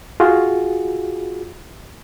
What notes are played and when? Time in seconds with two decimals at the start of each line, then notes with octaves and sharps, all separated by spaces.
0.20 F4 F#4 G#4